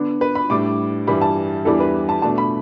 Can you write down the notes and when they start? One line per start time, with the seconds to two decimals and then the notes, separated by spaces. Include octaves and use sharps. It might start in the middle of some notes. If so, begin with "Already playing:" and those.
Already playing: D3 B3 D4
0.21 B4
0.35 B5
0.50 A2 G3 D4 D6
1.07 G2 E3 G3 B5
1.22 A5
1.65 E2 E3 G3 D4 A4
1.80 B4
2.09 A5
2.22 B2 A3 D4 A5
2.38 B5